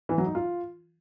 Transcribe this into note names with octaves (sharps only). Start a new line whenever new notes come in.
E3
F#3
D#4
F4